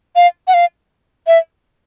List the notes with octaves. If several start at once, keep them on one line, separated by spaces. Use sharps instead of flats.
F5
F#5
F5
E5